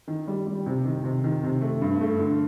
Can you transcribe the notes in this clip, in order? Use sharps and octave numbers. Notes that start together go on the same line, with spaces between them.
D#3
G3
G3
C3
D#3
C3
D#3
C3
A3
G2
A3
D3